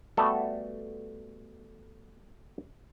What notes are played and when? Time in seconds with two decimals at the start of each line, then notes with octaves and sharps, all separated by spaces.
0.17 G3 A3 B3 F#4 A4